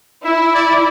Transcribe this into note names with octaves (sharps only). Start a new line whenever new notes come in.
E4 E5
D5